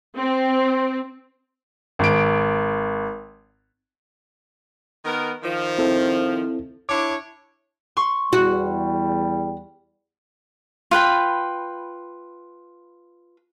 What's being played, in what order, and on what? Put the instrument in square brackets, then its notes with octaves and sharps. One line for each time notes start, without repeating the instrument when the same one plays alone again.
[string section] C4
[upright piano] G#1 D7
[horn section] D#3 B3 A#4
D#3 F3
[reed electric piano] C4 E4 A4
[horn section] D4 E4 C#5 [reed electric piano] D6
[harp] C6 C#6
[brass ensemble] E2 G3 [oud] F#4
[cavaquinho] F4 B4 G5 B5